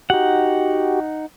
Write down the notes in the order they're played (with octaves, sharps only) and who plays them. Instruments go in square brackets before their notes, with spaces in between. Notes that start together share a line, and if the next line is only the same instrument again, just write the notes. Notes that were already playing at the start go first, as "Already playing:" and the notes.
[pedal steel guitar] D#4 F#5 [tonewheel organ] F#4 G4